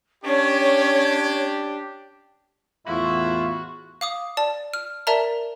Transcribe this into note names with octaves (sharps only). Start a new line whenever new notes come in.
C#4 D4 G4 C#5
E2 A2 F4 F#4 E5 B5
F5 D6 D#6
D5 A5
F6
A#4 D5 E5 A5 A#5